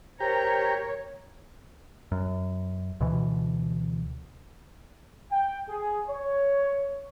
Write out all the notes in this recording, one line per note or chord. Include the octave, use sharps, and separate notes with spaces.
G4 A#4 C5 C#5 A#5
F#2
D2 B2 E3
G5
G#4
C#5